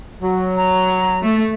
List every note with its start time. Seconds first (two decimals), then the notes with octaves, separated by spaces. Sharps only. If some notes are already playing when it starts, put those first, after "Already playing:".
0.22 F#3
0.57 A#5
1.22 A3